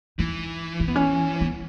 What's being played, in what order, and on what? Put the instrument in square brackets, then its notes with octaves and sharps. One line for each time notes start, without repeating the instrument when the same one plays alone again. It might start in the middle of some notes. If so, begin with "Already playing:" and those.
[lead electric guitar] E3 [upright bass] D#4
[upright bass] C#4
B3
C#4
B3